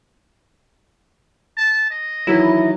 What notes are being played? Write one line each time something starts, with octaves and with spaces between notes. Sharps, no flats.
A5
D#5
D#3 E3 F#3 E4